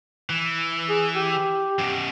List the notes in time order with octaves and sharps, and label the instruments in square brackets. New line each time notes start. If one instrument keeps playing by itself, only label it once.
[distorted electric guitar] E3
[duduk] G#4
G4
[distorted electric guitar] F#2 B2